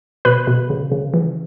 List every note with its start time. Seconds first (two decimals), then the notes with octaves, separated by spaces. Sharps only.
0.25 B2 B4 B5
0.47 B2
0.70 C#3
0.92 C#3
1.14 E3